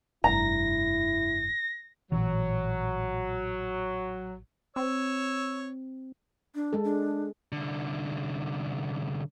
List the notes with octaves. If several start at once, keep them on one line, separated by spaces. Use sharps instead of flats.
F1 G2 E4 A#5 A#6
A1 A#2 E3 F#3
C4 C#5 E6
D4
G#3 A4
D4
C2 D3